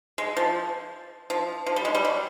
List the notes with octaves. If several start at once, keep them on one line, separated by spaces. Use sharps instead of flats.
G#3
F3
F3
F3
G3
G#3
G3
F#3